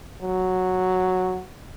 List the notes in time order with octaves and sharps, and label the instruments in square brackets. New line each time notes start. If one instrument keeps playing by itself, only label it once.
[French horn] F#3